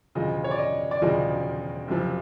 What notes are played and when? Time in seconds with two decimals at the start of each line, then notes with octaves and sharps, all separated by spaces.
0.15 E1 D2 C#3 F3 D#5
0.44 C#5
0.51 D5
0.59 D#5
0.91 D5
1.02 E1 D2 C#3 F3 D#5
1.88 F#1 F2 C3 F3